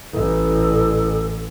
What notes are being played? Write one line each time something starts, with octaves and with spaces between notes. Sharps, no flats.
A1 A2 A4